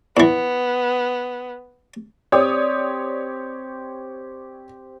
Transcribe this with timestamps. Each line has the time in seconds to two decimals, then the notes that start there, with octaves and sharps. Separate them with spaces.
0.17 E2 E3 B3
2.32 C4 G4 C#5 D5 D#6